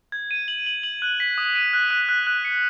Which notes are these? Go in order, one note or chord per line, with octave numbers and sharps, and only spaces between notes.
G#6
D#7
F#7
F#7
F#7
F#6
B6
D#6
D#7
F#6
F#6
F#6
F#6
C#7